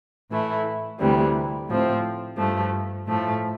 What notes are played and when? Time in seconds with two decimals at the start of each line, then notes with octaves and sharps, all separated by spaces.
0.30 A2 E3 A3 E4
0.99 D2 C3 E3 G3
1.68 A2 F3 C4
2.37 G2 F3 A3
3.07 A2 F3 A3